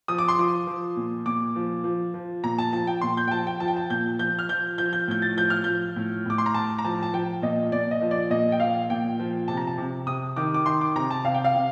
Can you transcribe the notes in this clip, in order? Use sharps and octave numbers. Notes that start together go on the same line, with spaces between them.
F3 D#6
D6
C6
F3 D6
F3
A#2
A#2 D6
F3
F3
F3
A#2 A#5
A5
F3 A5
G5
A#2 C6
G6
G5
F3 A5
G5
F3 A5
G5
A5
A#2 G6
F3 G6
F6
F3 G6
F3 G6
G6
A2 G6
A6
F3 G6
F6
F3 G6
A2
A2 D6
C6
A#5
A2 A5
A#5
F3 A5
A5
F3 G5
A#2 D#5
A#2 D5
D#5
F3
D5
A#2 D#5
G5
F3 F5
A#2 G5
F3
C3 A5
A#5
A5
C3
C3 D#6
D#3 D6
D6
D#3 C6
D6
C3 A#5
A5
C3 F5
G5
F5
C3